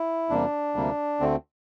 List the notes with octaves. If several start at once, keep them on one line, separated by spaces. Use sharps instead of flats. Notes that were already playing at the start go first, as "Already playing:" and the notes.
Already playing: E4
E2 C3 G3 A#3 D4
D2 C3 G3 A#3
D2 D3 A3 C4